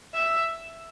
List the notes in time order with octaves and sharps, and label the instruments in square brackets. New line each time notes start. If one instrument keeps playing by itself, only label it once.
[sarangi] E5